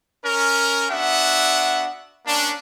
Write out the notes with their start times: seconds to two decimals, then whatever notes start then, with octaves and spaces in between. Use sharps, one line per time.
0.24 C#4 A#4
0.91 B3 D4 F#4 E5 F#5
2.27 A#3 C#4 D4